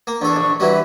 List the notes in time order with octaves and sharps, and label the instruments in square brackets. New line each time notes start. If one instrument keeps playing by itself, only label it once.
[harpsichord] A#3
[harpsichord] E2 A4 [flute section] D4 C#6
[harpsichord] A#1
[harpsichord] E3 F#3 G3 [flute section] B4 E5